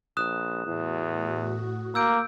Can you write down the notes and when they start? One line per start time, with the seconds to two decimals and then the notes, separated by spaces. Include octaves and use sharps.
0.17 A#1 D#6 F#6 E7
0.66 E2 A2 F#4
1.95 A#3 E6 G6 D7